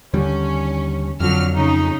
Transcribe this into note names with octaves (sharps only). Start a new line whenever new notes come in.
D#2 D3 G3 C#4
F2 D3 F#3 F6
C#3 D#4